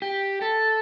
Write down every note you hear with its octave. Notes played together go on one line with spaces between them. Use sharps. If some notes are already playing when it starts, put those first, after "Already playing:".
G4
A4